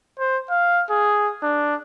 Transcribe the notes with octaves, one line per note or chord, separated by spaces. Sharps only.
C5
F5
G#4
D4